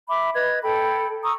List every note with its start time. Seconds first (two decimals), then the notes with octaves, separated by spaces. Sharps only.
0.09 E5 B5 D6
0.35 B4 D#5 G#6
0.64 A4 G5 B5
1.24 A#5 C#6 D#6 E6